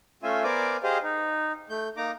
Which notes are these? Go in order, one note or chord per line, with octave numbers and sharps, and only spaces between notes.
A3 C#4 F4 E5 G#5
B3 A#4 C5 D5 G#5 D6
G4 G#4 C5 D#5 F5
D#4
A3 G6
A#3 D#4 A#5 D6